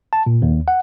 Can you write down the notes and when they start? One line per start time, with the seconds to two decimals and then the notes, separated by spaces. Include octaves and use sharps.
0.13 A5
0.26 A#2
0.42 D#2
0.68 F#5